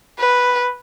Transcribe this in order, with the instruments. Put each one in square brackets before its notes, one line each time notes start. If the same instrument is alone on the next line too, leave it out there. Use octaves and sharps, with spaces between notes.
[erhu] B4